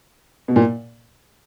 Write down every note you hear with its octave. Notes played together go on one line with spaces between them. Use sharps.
B2
A#2